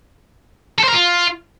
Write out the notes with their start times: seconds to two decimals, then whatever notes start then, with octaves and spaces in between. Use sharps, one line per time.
0.78 A4
0.84 C5
0.89 A#4
0.94 F4